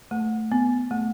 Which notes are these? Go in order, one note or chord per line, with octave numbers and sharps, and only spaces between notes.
A3
B3
A3